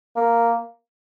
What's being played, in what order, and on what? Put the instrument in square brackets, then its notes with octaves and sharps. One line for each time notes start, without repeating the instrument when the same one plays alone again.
[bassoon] A#3